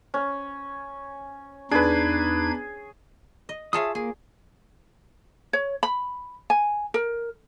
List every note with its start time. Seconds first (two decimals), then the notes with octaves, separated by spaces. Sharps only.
0.14 C#4
1.71 E2 D4 D#4 G#4 B4 G#6
3.49 D#5
3.73 F4 G#4 C#5 E5 A5 D#6
3.95 A#3 G#4
5.53 C#5
5.83 B5
6.50 G#5
6.94 A#4